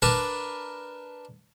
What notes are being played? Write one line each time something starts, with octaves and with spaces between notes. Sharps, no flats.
D4 A#4 B4 A5